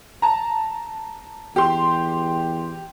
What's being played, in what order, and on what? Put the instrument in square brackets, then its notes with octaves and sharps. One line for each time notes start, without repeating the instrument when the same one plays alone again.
[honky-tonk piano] A5 A#5
[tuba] E2 [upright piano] G4 C6